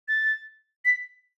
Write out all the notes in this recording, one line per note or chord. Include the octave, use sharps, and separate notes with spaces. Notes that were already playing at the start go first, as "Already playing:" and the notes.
A6
B6